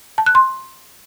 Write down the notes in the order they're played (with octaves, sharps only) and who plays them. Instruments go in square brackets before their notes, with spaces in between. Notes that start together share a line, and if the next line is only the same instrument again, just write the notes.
[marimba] A5
F#6
C6